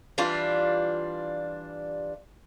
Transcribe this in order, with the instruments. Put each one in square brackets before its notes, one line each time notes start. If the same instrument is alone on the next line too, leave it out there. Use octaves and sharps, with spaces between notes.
[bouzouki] E3 G3 D4 F4